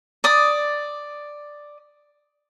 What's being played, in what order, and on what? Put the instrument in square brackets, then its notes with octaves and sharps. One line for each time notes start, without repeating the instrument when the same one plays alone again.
[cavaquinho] D5 D#6